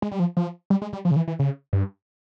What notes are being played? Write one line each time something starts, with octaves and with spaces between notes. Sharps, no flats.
G#3
G3
F3
F3
G3
G#3
G3
F3
C#3
E3
E3
C#3
G2